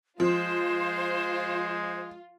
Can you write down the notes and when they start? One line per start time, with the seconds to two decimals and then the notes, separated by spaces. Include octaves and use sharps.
0.20 F3 G#3 F4 C5